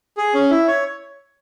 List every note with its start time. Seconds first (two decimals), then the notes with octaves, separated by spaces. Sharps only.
0.17 G#4
0.34 C#4
0.50 E4
0.67 C#5